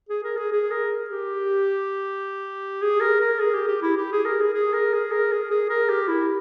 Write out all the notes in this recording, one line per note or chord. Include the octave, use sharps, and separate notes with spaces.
G#4
A#4
G#4
G#4
A#4
G4
G#4
A#4
A#4
G#4
G4
G4
E4
G4
G#4
A#4
G#4
G#4
A#4
G#4
A#4
G#4
G#4
A#4
G4
E4